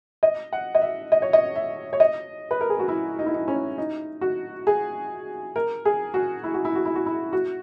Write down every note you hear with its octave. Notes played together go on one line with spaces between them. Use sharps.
D#5
F#5
D#5
E5
D#5
C#5
D#5
E5
C#5
D#5
B4
A#4
G#4
F#4
E4
D#4
E4
D#4
C#4
D#4
F#4
G#4
A#4
G#4
F#4
E4
F#4
E4
F#4
E4
F#4
E4
F#4